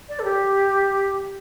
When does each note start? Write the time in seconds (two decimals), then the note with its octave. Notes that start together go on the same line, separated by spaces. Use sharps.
0.09 D5
0.19 A4
0.24 G4